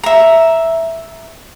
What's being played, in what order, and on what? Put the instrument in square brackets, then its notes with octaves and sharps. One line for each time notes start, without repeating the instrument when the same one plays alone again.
[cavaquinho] E5 A#5